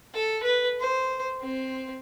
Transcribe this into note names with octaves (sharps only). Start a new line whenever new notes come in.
A4
B4
C5
C4